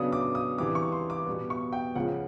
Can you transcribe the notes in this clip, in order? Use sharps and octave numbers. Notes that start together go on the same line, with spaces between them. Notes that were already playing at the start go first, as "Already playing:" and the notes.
Already playing: C#3 F#3 B3 D4 D#6
D6
D#6
C3 E3 G3 D6
C#6
C6
D6
B2 G3 B3
C#6
G5
C#2 C#3 F3 F#5